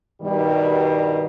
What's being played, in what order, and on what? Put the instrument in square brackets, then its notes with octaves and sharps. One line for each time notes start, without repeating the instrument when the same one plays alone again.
[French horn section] G2 B2 D#3 G3